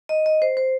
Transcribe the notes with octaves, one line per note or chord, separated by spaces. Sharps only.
D#5
D#5
C5
C5